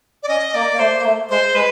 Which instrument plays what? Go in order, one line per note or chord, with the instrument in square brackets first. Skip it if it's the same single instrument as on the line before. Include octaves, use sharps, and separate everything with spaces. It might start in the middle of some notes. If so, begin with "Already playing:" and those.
[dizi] D5
[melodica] C#4 [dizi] D#5
[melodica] A#3 [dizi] D5
[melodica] A#3
[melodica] A3 [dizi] C5
[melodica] A#3
A3
[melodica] G#3 [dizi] C5
[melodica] G#3 [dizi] B4